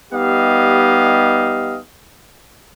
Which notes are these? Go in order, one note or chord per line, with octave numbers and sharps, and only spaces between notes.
G3 B3 D#4 G4 D#5 F5